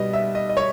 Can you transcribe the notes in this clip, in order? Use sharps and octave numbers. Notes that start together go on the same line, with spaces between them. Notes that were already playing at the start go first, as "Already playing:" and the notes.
Already playing: B2 G3 B3 D#5
E5
D#5
D#5
C#5